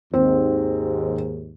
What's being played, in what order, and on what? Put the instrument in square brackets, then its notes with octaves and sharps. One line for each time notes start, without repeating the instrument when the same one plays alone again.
[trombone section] D#2 G#2 [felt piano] C4